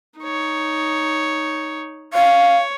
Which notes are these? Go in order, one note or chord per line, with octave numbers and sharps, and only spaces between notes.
D#4 C#5
C#5 F5